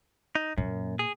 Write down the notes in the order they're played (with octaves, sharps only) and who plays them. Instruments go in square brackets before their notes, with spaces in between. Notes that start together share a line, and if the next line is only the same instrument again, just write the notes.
[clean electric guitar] D#4
[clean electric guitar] F#2 [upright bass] A#2
[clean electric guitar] G#4